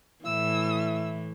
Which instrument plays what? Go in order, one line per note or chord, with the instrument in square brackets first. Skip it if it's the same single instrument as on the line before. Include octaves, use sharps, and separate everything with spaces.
[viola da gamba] A2 E3 [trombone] E4 [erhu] E6